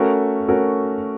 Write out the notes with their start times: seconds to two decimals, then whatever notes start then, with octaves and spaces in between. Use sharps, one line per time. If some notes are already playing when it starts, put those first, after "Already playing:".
Already playing: A3 C#4 F#4 A#4
0.48 A3 C#4 F#4 A#4